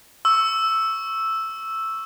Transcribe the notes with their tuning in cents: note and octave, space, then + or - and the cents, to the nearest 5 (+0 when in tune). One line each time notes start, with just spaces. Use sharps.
C#6 +0 E6 +0